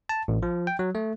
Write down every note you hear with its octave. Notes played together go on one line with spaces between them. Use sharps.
A5
A1
F3
G5
F#3
A3